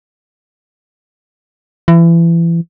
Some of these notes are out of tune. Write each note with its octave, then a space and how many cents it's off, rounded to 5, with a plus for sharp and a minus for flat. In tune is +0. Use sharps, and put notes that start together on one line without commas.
E3 +30